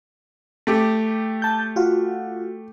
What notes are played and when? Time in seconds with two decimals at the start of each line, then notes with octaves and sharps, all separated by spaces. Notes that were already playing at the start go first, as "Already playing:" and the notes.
0.67 A3 G4
1.42 A5 G6
1.76 F4 F#4